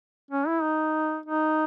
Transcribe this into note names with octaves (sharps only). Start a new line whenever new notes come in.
C#4
E4
D#4
D#4